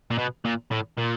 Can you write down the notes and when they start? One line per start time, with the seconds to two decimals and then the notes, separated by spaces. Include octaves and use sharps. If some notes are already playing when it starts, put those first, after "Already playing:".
0.11 A#2
0.18 B2
0.45 A#2
0.71 A2
0.98 A#2